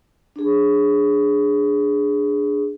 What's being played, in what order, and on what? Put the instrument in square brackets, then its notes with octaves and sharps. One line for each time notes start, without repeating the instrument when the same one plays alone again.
[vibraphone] D4 G#4